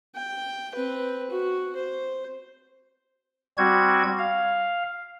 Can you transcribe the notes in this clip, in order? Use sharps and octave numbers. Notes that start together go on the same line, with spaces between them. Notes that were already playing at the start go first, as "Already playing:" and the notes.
G5
C4 B4
F#4
C5
G3 C4 F#4 G#6
F5